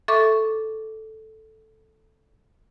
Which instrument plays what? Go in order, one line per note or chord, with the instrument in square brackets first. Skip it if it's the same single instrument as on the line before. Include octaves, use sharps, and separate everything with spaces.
[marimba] A4 E5 C#6 D6